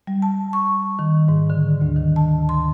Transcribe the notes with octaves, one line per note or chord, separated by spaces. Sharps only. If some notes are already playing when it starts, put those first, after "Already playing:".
G3
A5
C#6
D#3
G#2
D3
D2
D#3
A5
C6